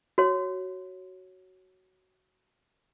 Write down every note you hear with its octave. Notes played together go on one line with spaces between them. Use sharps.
F#4 C#5